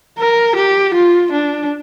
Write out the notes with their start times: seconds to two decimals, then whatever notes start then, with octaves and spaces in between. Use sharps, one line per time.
0.18 A#4
0.56 G4
0.94 F4
1.32 D4